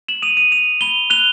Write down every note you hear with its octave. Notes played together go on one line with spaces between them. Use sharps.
E7 F#7
D#6 D#7 F7
D#7 F7
D#6 D#7 F7
B5 F7 G7
F#6 F7 G7